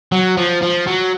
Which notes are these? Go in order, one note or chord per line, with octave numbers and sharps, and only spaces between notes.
F#3
F3
F3
F#3